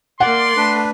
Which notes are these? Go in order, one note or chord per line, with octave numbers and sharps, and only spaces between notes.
A#3 D5 F#5 C6
A3 D4 B4